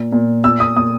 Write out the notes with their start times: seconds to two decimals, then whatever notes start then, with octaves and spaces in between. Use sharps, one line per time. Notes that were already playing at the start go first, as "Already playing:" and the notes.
Already playing: A#2
0.12 A#2
0.44 A#2 E6
0.60 D#6
0.76 A#2 D#6